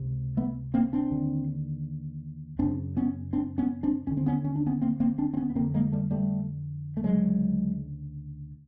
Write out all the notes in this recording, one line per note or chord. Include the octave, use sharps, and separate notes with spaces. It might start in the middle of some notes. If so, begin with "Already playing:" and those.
Already playing: C#2 C3
A3 B3
A#3 C4
C4 D4
D#2 D3
F#2 C#3 C4 D4
B3 C#4
C4 D4
B3 C#4
C4 D4
D#2 D3 C#4
C4
B3 C#4
C#4
D4
B3 C#4
A#3 C4
A#3 C4
C4 D4
C4
B3 C#4
B3
F2 D3 A#3 C4
G#3 A#3
G3 A3
G3 A3
A3
D2 C#3 F#3 G#3